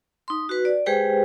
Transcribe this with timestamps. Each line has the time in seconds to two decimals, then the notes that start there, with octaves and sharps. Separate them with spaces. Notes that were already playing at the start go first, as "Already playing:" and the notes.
0.28 D#4 C6
0.49 F#4 B4
0.65 D5
0.86 G#3 G4 G#4 B4 C5 G5